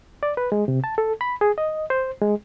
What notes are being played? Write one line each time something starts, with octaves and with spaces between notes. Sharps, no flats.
D5
B4
G#3
C3
A5
A4
B5
G#4
D#5
C5
G#3